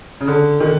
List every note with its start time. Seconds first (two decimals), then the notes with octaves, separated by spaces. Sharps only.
0.21 C#3
0.28 D3
0.60 D#3